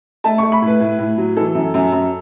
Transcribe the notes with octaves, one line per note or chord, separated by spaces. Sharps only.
A3 A5
A3 C#6
B5
A2
B4
A2
A2
F#3
E3 A4
F#2
F#2
F#2